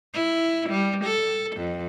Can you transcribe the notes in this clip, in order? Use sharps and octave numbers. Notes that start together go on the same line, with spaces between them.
E4
G3
A4
F2